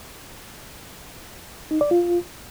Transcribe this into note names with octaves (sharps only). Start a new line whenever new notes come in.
D#4
D5
F4